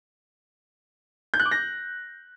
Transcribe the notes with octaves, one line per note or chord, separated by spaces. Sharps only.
G6
F#6
D6
A#6